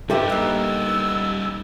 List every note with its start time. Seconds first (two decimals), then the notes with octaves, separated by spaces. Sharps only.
0.10 G2 C3 G3 D#4 G4 A4 B4 E5
0.30 A#3 B3 E6